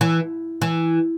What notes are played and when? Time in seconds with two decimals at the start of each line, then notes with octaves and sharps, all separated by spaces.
0.01 E3
0.62 E3